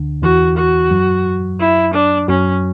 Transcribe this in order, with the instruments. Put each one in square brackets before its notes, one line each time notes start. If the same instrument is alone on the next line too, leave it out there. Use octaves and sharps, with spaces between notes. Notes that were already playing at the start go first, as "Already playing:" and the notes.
Already playing: [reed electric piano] D2 D3
[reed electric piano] E2 E3 [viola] F#4
[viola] F#4
[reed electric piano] F#2 F#3
[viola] E4
D4
[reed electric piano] F#2 F#3 [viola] C#4